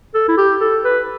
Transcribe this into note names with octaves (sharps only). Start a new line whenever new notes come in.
A4
E4
G4
A4
B4